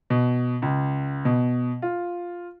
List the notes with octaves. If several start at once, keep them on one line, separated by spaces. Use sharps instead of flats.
B2
C#2
B2
F4